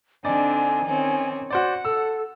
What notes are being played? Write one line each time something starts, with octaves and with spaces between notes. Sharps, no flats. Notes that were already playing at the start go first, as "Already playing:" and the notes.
D3 C4 D4 D#4 D5 G#5
D#3 C4 C#4
F#4 C5 D5 F#5
A4 E6